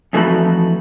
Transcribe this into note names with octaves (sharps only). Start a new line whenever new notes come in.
F2 E3 A3 D#4 F#4 B5